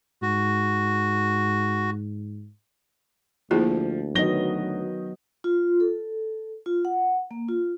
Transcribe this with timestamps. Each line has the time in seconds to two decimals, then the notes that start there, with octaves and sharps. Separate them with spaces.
0.22 G#2 F#4
3.51 D2 F3 A#3 E4 G#4
4.15 D#3 F#3 B3 D#5 A#6 G7
5.44 F4
5.80 A4
6.66 F4
6.85 F#5
7.31 A#3
7.49 F4